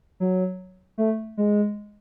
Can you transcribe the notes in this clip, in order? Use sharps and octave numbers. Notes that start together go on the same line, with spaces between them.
F#3
A3
G#3